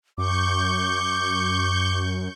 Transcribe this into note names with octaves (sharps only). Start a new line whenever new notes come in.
F#2 C#6 D6 G6